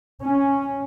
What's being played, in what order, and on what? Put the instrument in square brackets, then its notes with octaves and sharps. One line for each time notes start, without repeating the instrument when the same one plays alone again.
[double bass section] C#4